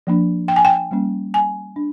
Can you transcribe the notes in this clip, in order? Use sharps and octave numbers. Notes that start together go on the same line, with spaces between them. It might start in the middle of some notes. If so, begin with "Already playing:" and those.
F3 A#3 D4
G5
G#5
G5
G3 A#3 C#4
G#5
D4